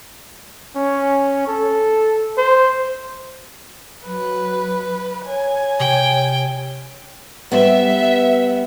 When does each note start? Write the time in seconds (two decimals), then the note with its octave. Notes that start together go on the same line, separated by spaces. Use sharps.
0.76 C#4
1.47 A4
2.38 C5
4.06 F#3 B4
5.26 C#5 G#5
5.80 C3 G5
7.52 G3 B3 E5